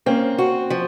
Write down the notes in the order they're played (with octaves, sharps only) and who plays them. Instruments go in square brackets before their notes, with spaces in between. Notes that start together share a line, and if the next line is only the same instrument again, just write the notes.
[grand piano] A#3 C#4 [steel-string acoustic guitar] C4
[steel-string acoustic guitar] F#4
F3